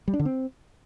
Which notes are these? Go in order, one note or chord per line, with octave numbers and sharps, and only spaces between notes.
G3
D4
D3
C4